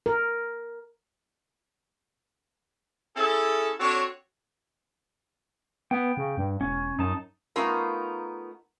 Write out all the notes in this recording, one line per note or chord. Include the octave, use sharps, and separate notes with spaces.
A#4
C#4 E4 G#4 A4
C4 D4 F#4 A4 C#5
B3 G5
C#3
G2
E1 C#4
F#2 D#4 A5
A3 B3 C#4 D#4 F4 A#4